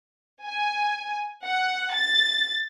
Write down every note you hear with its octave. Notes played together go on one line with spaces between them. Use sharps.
G#5
F#5
A6